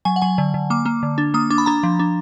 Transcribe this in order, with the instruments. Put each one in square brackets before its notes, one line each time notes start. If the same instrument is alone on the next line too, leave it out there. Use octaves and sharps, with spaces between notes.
[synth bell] F#3 G#5
F#5
F#3 G#5
D3
D3
A#3 D6
A#3
D3
D4
A#3 D#6
D4 D6
B5
D4 A#5
F3
D4